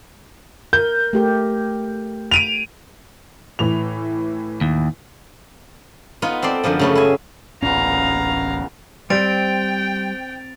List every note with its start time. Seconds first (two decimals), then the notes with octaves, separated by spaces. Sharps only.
0.73 A#4 G6
1.13 A3 G4 A#4
2.31 D7 D#7 F7
3.59 A2 E3 F7
4.61 D#2
6.22 B3 D#4 F4
6.42 C4 A4 D5 C6
6.64 F#2 D3 F3 B3
6.79 C#3 A3 B3
6.95 E4 G#5
7.63 D1 A1 A#2 C#3 B3 C#4 F5 A#5
9.10 G3 C4 G5 A6 D7 F7